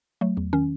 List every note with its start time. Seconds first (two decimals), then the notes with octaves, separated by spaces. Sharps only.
0.21 F#3 A3
0.37 E2
0.53 D#3 C#4